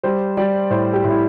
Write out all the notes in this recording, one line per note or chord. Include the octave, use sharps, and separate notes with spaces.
G3 C5
G3 D5
A2 C5
G4
A2
E4